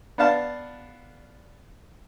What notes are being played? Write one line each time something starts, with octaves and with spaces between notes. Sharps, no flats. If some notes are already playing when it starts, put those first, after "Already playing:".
B3 D4 F5 A5